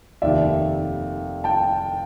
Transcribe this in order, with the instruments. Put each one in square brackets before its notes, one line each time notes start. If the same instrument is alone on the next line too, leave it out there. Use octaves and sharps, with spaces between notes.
[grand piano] F1 D#2 D#3 D5 E5
G5 A5